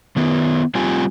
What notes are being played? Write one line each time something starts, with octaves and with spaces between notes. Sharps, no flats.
D#3 B3
G3 C4 F4 G4 G#5